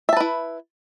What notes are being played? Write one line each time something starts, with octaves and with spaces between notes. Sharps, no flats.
E4 B4 E5 A5